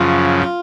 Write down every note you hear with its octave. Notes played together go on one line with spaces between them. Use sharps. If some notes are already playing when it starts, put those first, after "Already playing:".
Already playing: F#2 C#3 F3 F4
F4